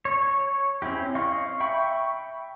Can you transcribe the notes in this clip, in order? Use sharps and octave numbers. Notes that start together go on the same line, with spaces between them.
C#5
C4 C#4 E4 G4
D#5 F5 C6 C#6
E5 G5 B5 C#6